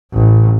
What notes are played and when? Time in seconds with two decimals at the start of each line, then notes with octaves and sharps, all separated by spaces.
0.16 A1